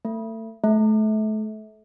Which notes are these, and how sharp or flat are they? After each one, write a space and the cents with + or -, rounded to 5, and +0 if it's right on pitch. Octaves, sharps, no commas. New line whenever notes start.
A3 +30
A3 -30